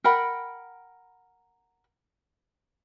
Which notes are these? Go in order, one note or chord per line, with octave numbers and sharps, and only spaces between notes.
A#4 F#5 G5 B5